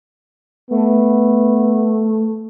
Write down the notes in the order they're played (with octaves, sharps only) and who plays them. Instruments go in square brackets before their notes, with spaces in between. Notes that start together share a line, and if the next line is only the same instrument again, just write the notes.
[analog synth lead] A3 [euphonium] B3